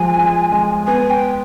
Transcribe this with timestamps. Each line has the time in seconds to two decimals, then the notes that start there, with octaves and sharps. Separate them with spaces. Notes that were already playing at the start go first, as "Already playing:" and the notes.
Already playing: F3 G#3 G#5
0.18 G#3
0.52 G#3
0.87 B3 G#5
1.10 G5